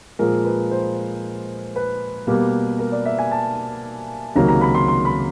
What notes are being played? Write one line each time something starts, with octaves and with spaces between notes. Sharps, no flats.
A#2 F3 G#3 A#4
B4
C5
B4
B2 G3 A#3
A#4
D5
E5
G#5
A5
C#2 C3 D#3 F#3 A#3 A#5
A#5
B5
C6
C6
B5